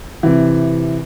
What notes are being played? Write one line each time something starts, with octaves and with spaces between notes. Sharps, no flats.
C3 E3